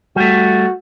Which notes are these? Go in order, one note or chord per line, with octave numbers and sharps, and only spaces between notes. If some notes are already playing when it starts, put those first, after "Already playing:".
G3 A3 F#4